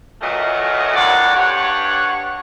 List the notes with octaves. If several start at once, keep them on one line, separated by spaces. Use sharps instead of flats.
D2 A#2 E3 F#3 A3 D#5
D#2 A2 C#5 D5 F#5
G2 C#5 F#5